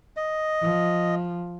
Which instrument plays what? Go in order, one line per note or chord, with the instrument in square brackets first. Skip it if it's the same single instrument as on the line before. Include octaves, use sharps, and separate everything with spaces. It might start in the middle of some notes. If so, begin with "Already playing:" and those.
[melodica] D#5
[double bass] F3